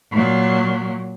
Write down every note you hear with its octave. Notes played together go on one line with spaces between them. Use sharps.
A#2 F#3